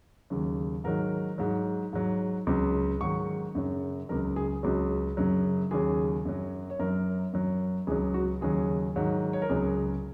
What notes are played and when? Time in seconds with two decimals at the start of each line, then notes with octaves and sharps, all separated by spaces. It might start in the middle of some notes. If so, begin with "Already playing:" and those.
0.30 D#2 C#3 F#3
0.84 G#2 D#3 F#3 A#4
1.38 G#2 F#3
1.93 G#2 F#3
2.47 C#2 C#3 F#3
3.01 G#2 D#3 F#3 C#6
3.55 F#2 C#3 F#3
4.09 C#2 C#3 F#3 A#4
4.36 G#4
4.63 C#2 C#3 F#3 F#4
5.17 F#2 C#3 F#3
5.71 D#2 C#3 F#3 G#4
6.25 F#2 F#3
6.70 C#5
6.79 F#2 F#3 A#4
7.33 F#2 F#3
7.87 C#2 C#3 F#3 G#4
8.14 F#4
8.41 D#2 C#3 F#3 G#4
8.96 G#2 D#3 F#3
9.33 C#5
9.42 A#4
9.50 C#2 C#3 F#3 G#4